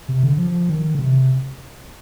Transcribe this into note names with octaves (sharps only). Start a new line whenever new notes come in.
C3
D3
F3
D#3
D3
C3